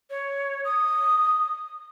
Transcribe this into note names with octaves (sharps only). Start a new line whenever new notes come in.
C#5
D#6